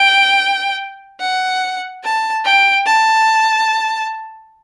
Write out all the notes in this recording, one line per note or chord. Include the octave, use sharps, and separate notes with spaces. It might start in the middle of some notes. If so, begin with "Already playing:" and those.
Already playing: G5
F#5
A5
G5
A5